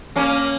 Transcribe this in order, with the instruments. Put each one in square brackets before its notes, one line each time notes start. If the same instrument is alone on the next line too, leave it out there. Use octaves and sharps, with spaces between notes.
[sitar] A#3 C#4